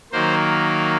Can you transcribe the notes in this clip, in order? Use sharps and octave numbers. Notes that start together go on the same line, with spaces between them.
D#3 F#3 A#3 C5